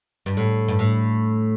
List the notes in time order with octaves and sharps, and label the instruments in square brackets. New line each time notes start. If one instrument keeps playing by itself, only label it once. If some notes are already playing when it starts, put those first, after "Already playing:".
[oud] G2
A2
G2
A2